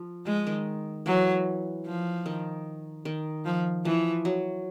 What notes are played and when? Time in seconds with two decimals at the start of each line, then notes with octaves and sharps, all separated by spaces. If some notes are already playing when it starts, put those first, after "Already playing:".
Already playing: F3
0.26 F3 G#3
0.47 D#3
1.06 E3 F#3
1.86 F3
2.26 D#3
3.05 D#3
3.45 F3
3.85 E3 F3
4.25 F#3